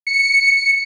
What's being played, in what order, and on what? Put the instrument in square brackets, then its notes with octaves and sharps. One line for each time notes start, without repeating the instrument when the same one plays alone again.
[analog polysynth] C#7